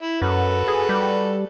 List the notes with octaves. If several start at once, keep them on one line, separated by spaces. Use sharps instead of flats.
E4
F#2 F#4 A4 B4
G#4
G3